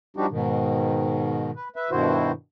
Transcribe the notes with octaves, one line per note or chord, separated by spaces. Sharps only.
F3 G3 D4 D#4 F#4 G4
G#2 B2 D#3
B4
B4 E5
G2 B2 D#3 E4 F#4 C5